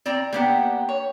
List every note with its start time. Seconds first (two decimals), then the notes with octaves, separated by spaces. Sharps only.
0.06 C4 D5 A#5
0.33 A#3 B3 D4 G4 F#5
0.89 C#5